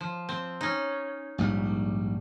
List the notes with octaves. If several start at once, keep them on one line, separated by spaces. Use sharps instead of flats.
F3
C4
C#4 D#4
A#1 G#2 G3